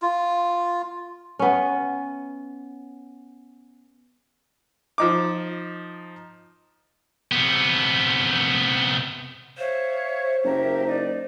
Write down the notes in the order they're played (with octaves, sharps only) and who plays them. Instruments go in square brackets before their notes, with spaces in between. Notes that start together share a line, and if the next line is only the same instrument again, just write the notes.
[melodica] F4
[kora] B3 C#4
[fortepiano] F3 D#4 D6
[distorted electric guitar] C3 B3
[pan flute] C5 [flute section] C#5 E5 F5
[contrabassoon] F#1 [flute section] G4 A#4 E5
[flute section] D#4 D5